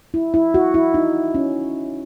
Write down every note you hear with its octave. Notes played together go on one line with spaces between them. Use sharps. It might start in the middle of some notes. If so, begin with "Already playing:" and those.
E4
E4
F#4
E4
D#4
C#4